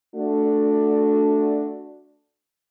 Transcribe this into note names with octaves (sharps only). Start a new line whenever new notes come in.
A3 D4 F#4